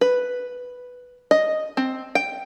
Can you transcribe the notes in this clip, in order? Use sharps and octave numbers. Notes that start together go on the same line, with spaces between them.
B4
D#5
C4
G5